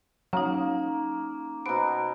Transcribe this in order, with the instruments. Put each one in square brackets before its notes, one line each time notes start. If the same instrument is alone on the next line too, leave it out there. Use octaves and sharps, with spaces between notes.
[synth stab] F#3 [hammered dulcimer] A#3 [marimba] C#4 D#4
[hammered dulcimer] B2 B3 [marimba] C5 [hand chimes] A#5 D7